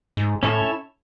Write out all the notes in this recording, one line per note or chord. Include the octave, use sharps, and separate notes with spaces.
G#2
A2 C#4 E4 A4 C#5 E5